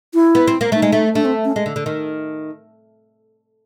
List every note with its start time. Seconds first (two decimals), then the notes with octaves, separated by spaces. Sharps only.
0.14 E4
0.35 B3
0.48 C4
0.61 A#3
0.72 A3 D#4
0.82 G#3
0.92 A3
1.15 A3 D4
1.25 C4
1.45 C#4
1.56 G#3
1.66 D3
1.76 D3
1.86 D#3